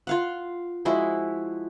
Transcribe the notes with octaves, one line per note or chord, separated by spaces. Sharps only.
F4 F5 F#5
F3 G#3 E4 F#4